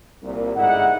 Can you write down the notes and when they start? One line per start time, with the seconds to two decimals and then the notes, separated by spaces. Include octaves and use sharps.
0.23 C2 A#2
0.56 G1 G#2 D#4 E4 D5 F#5